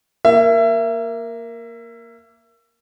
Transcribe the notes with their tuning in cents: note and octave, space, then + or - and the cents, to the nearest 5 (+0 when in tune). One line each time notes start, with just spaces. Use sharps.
A#3 +0 E5 +25